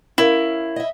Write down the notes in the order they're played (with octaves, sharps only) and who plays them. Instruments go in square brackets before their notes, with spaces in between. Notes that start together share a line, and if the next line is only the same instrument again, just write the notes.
[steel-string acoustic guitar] C#4 A#4 F5 [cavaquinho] E4
[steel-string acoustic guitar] D#5 E5